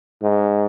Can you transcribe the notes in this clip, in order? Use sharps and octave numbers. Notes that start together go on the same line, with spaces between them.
G#2